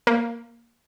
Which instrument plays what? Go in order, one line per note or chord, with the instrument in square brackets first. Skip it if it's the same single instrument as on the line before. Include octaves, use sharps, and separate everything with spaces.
[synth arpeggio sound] A#3